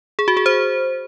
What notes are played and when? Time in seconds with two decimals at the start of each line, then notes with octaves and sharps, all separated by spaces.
0.19 G#4
0.28 F#4
0.37 G#4
0.46 C5